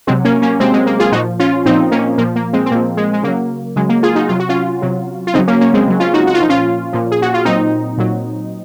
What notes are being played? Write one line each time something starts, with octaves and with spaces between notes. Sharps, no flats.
C3 F#3 G#3 C4
A#3 C#4
A#3 C#4
C3 F#3 G#3 C4
G#3
A#3
F4 G#4
A#2 F3 D#4 F#4
C#4 F4
A#2 F3 C4 D#4
A#3 C#4
A#2 F3 A#3
A#3
G#3 C4
C4
A#2 F3 A#3
G#3
G#3
C#3 F#3 A#3
C#3 F#3 G#3
A#3
F4 G#4
D#4 F#4
C3 F#3 F4
F#4
C#4 F4
C3 F#3
F4
C#3 F#3 C4 D#4
A#3 C#4
A#3 C#4
G#3 C4
C#3 F#3
C#4 F4
D#4 F#4
F#4
F4
A#2 F3 D#4
C#4 F4
A#2 F3
G#4
F#4
F4
A#2 F#3 C4 D#4
A#2 F#3